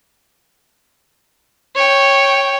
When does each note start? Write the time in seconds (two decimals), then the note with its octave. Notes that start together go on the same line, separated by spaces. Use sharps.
1.75 C#5 G5